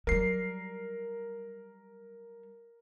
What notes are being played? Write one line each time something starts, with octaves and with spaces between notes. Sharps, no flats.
F#3 G3 A#4 C7